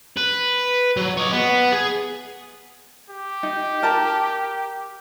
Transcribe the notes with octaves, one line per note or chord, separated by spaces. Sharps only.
B4
F#3
C#5 D#5
B3
G#4
G4
D#4
A#4 A5 A#5